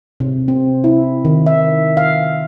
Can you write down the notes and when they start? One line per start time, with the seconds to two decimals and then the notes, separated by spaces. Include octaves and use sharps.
0.20 C3
0.48 C4
0.84 E4
1.25 D#3
1.46 E5
1.97 F5